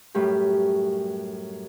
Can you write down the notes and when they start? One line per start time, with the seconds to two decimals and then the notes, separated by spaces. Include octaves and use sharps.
0.15 F#2 A2 G3 G4